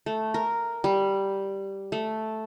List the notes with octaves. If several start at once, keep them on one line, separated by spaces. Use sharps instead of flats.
A3
A#4
G3
A3